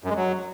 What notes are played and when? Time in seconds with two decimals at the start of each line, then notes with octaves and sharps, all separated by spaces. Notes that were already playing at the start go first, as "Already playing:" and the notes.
0.04 F#2
0.10 G#3
0.16 F#3